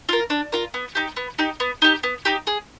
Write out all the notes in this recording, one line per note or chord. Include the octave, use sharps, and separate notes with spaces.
F4 A#4
D4
F4 A#4
B3
D#4 G4
B3
D#4 G4
B3
D#4 G4
B3
D#4 G4
G#4